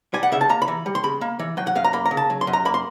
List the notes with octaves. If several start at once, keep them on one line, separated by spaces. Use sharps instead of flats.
G3 G#5
F#5
C#3 E5
A5
A#3 A#5
B5
E3
G3
C6
C#3 B5
A#3
E3
F#3 G5
F#5
F#2 F5
A#5
A#3 B5
A#5
C#3
A5
F#3
C6
F#2
A#5
A#3 B5
C6